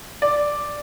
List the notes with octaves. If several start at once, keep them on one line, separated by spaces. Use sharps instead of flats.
D5